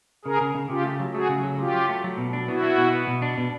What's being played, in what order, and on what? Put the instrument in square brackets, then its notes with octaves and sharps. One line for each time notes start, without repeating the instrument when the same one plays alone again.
[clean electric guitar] C#3 [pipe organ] G#4 A#4
[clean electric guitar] C#3
C#3
[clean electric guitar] C#3 [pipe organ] F4 G4
[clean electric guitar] A3
F#3
[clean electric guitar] A3 [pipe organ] F#4 G#4
[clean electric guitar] C#3
F#3
[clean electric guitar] F#3 [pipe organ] F4 G4
[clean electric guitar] F#3
A3
F#3
B2
D4
[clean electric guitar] B3 [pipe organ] E4 F#4
[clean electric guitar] B3
B2
B3
B2
D4
B2